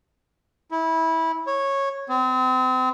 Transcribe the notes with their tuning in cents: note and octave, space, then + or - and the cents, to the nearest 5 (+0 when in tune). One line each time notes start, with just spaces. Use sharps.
E4 -20
C#5 -10
C4 -35